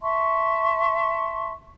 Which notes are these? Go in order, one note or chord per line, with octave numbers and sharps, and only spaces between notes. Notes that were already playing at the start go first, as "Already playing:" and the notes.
E5 A5 C6 C#6